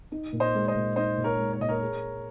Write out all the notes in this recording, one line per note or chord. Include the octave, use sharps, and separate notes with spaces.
D#4
A#2
C5 D#5
G#3
C5 D#5
A#2
D#4 C5 D#5
A#2
A#4 C#5
G#3
C#5
A#2 D#5
A#4 C#5
G#4